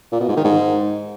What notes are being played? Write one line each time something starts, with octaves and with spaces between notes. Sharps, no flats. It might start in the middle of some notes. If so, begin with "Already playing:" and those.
A#2
B2
G#2
D#3
G#2